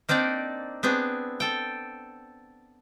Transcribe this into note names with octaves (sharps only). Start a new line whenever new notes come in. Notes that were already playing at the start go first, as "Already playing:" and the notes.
A#3 C4 D4 D#4 D5
B3 C4 D4 G#4
A4 G5